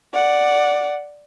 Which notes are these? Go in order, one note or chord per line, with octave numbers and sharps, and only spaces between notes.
D5 F#5